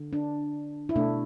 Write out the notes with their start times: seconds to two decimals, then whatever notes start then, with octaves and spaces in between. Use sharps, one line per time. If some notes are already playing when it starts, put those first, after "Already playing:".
Already playing: D3
0.13 D4
0.89 E4
0.96 B2 A3 D4